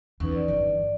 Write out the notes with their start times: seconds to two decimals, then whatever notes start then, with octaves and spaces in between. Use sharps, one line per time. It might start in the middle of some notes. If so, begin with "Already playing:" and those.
0.20 E2 C#4 D#4 B4
0.34 D5
0.48 G1 E3 D5